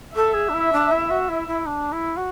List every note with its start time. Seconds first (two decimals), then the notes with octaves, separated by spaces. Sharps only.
0.15 A4 E5
0.33 G#4
0.49 D4
0.53 E4
0.72 D4
0.91 E4
1.10 F#4
1.28 E4
1.47 E4
1.66 D4
1.92 E4
2.16 F#4